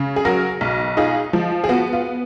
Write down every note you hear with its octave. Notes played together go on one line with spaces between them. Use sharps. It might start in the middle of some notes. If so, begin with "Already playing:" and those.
Already playing: C#3
G#4
F#3 F#4 A#4
B1
D#4 F4 G#4
F3
G#4
B3 F#4
F4